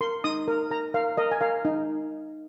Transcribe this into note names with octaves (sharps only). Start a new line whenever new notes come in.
A#4 C6
D#4 D#6
A#4
A#4 A#5
A#4 F5
A#4 D#5
G#5
A#4 F5
D#4